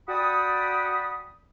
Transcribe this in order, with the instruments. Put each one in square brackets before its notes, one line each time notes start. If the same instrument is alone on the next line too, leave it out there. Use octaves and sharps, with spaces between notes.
[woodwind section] F#4 D5 G5 A5 B5 D#6